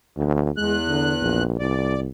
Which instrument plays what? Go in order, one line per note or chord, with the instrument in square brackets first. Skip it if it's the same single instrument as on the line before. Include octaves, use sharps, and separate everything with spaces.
[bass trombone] D2
[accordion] E2 F#6 [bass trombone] G#3
[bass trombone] D3
A#1
[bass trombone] C2 [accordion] D5